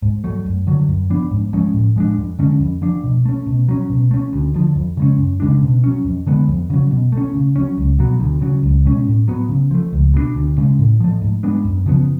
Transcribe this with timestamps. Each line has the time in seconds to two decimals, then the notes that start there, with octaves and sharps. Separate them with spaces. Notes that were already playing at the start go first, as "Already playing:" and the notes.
0.02 G#2
0.24 F#3 A3
0.46 F#2
0.67 D3 F#3
0.89 F#2
1.10 F3 B3 D4
1.31 G#2
1.53 F3 G#3 C#4
1.74 A2
1.96 F3 G#3 D4
2.18 F2
2.39 D3 G#3 C#4
2.60 F2
2.82 F3 A3 D4
3.04 B2
3.25 A3 C#4
3.47 B2
3.68 F#3 C#4
3.90 B2
4.11 A3 C#4
4.33 D2
4.55 D3 F3
4.76 F2
4.97 C#3 G#3 C#4
5.19 F#2
5.40 C#3 G#3 D4
5.62 B2
5.84 F#3 C#4
6.05 F2
6.26 D3 G#3 B3
6.49 F2
6.70 C#3 F#3
6.91 B2
7.12 A3 C#4
7.34 C#3
7.56 F#3 C#4
7.78 C#2
7.99 B2 F#3 B3
8.20 D2
8.41 C#3 F#3
8.63 C#2
8.85 B2 G#3 C#4
9.07 A2
9.28 F#3 B3
9.49 C#3
9.71 F3 A3
9.93 C#2
10.14 B2 G#3 D4
10.35 D2
10.58 C#3 G#3
10.79 A2
11.00 F3 A3
11.22 G#2
11.43 G#3 B3 D4
11.65 F#2
11.86 C#3 F3 B3